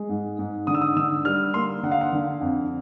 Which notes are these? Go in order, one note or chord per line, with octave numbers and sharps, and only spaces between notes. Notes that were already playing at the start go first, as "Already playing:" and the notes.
Already playing: G#3
G#2
G#2
D3 D#6
E6
D#6
D3 E6
G3 F6
A#3 C6
D3 F#5
F5
F#5
D3
F2